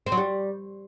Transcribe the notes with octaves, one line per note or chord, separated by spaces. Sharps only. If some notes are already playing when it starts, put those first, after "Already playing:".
C4
F#3
G3